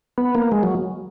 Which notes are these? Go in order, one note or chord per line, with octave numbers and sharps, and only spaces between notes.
B3
A#3
G#3
F#3